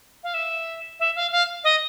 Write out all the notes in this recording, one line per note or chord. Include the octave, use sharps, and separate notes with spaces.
F5
E5
E5
F5
F5
D#5